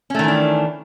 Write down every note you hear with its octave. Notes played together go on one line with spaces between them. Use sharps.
D#3 E3 A3 C#4 D4